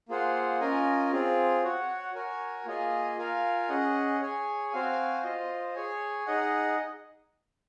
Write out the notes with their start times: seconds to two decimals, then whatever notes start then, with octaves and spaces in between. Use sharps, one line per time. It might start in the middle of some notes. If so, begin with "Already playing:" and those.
0.09 A#3 F4 G#4 C5 F#5
0.60 C#4 F4 A#4 D#5 G#5
1.12 C4 F4 G#4
1.63 F#4 C#5 F#5
2.14 F#4 A#4 C#5 G#5
2.66 A#3 F4 G#4 D#5 G#5
3.17 F4 A#4 F5 G#5
3.69 C#4 G#4 D#5 F#5
4.21 G#4 C#5 G#5
4.71 C4 F#4 C5 F5 G#5
5.24 F4 C5 D#5
5.75 G#4 C#5 G#5
6.26 D#4 G#4 D#5 F#5